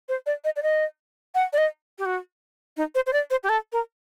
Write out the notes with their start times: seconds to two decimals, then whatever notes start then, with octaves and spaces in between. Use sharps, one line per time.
0.09 C5
0.26 D5
0.44 D#5
0.56 D5
0.63 D#5
1.35 F#5
1.53 D5
1.58 D#5
1.98 G4
2.05 F#4
2.77 D#4
2.95 C5
3.06 C5
3.13 D5
3.30 C5
3.43 G4
3.49 A4
3.72 A#4